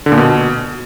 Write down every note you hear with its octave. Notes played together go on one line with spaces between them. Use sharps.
D3
A#2
B2